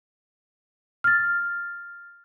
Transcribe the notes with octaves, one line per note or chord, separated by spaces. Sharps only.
F6 A6